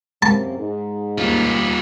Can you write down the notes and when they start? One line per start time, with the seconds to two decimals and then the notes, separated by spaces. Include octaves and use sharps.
0.22 F#2 C3 A#3 A5
0.57 G#2
1.18 D#2 G3 F4